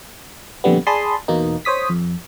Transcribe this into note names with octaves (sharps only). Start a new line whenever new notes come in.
F2 A#2 D3 G3 B3
G#4 D5 A5 B5 C6 D#6
E2 B2 A#3 D#4
C5 C#5 D#6 B6
F2